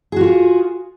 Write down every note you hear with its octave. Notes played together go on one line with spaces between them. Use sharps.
F4 F#4 G#4